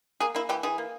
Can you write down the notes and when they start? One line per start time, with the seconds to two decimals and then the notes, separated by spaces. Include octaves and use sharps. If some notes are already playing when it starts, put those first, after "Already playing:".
0.20 A#3 G#4
0.35 A#3 E4
0.49 E3 G4
0.63 E3 G#4
0.78 A#3